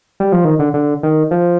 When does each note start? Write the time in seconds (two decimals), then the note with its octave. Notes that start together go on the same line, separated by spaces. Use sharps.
0.20 G3
0.32 F3
0.45 D#3
0.59 D3
0.74 D3
1.03 D#3
1.31 F3